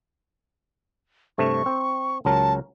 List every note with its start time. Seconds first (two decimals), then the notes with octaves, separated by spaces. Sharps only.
1.38 G2 C3 A3 C#6
1.66 C4
2.25 C#2 F#3 A#4 A5